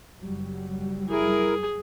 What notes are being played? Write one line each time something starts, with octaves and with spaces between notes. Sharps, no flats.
F#1 F#3 G3
E4 G#4 A#4